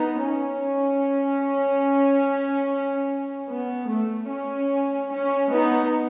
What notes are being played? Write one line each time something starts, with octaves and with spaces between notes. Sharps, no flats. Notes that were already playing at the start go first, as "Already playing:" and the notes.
Already playing: B3 D#4
C#4
B3
A3
C#4
C#4
B3 D#4